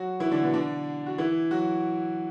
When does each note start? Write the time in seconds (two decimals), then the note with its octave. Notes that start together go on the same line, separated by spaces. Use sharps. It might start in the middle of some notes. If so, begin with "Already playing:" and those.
Already playing: F#3 F#4
0.20 E3 E4
0.31 D3 D4
0.42 B2 B3
0.53 D3 D4
1.06 F#4
1.18 E3 E4
1.51 F#3 F#4